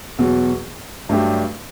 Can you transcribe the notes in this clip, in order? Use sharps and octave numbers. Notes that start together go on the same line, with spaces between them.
E2 B2 F#3
G2 F#3 A3 D4 G4